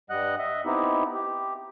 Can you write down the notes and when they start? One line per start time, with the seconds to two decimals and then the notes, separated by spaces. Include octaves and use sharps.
0.10 G2 G3 D#5 F#5 F#6
0.39 D#5 E5
0.66 B3 C4 D#4 E4 G4
1.14 G4